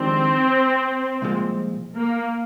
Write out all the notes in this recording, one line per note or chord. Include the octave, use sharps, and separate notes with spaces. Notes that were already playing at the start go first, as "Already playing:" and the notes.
Already playing: F2 D#3 G#3 C4 D4 G4
C2 A#2 F3 G#3
A#3